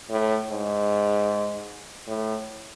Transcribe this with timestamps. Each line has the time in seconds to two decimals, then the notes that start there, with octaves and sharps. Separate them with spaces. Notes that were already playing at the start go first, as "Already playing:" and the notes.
0.10 A2
0.50 G#2
2.08 A2